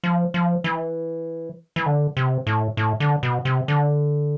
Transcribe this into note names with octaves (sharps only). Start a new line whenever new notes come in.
F3
F3
E3
E3
D3
C3
A2
A2
D3
B2
C3
D3